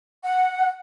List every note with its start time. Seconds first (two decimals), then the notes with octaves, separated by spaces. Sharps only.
0.24 F#5